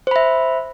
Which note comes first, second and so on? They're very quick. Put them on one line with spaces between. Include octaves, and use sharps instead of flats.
C5 B5 E5